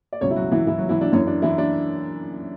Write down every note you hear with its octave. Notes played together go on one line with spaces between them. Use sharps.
D5
C#2 B2 F#3 C#4 C#5
E4
F#3 F#4
E3 E4
E3 E4
F#3 F#4
E3 E4
D4
F#2 E3 C#4
D4
E3 E4
D4